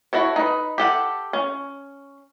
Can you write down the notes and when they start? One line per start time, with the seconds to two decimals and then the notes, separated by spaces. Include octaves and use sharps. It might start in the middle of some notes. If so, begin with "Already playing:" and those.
0.13 E4 F#4 A4 C#5
0.36 D#4 B4
0.78 G4 A4 F#5
1.33 C#4